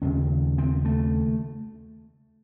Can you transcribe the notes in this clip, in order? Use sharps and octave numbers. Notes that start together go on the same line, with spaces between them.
D#2 C#3 C#4
C4
A3